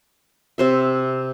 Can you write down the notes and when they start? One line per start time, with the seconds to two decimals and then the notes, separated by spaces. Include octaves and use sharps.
0.58 C3 C5 E5